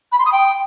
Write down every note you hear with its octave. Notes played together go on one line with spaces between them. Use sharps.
B5
C6
D#6
G5